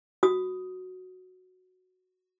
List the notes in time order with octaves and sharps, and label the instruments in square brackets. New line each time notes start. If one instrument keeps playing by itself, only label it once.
[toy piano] F#4 D#6